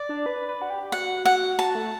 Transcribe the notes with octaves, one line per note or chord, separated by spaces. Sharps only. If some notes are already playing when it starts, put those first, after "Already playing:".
Already playing: D5
D4
B4
B4
F#4
G4
F#4 F#5
F#5
F#4 A5
A3